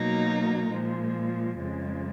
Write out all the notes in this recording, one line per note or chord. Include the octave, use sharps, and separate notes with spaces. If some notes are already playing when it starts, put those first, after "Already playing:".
Already playing: B2 F#3 A#3 D#4 A#4
A#2 F3 G#3
F2 C#3 G#3